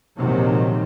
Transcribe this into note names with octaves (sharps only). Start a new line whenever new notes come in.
A#1 D#2 G#2 C3 D#3 F#3